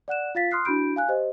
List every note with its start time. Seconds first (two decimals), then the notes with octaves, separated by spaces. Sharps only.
0.08 D5 F#5 F#6 E7
0.35 F4 F5 A6 B6
0.51 C6 D#6 F6 F#6 C7
0.65 D4 E4 F#4 B5 G6 D7
0.96 F5 G#5 F#6
1.08 G4 C5 D#5